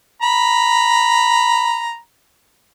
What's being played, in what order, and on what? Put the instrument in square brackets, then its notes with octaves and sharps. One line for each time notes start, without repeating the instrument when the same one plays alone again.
[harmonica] A#5 B5